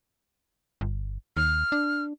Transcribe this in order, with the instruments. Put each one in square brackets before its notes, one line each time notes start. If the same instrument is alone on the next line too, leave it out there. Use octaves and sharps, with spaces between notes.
[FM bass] G1
[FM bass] D#2 [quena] F6
[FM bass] D4